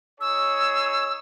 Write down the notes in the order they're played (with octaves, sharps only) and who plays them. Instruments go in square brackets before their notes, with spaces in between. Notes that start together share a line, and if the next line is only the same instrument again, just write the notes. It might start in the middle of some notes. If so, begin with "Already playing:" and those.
[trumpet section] D#4 G#4 C#5 [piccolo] E6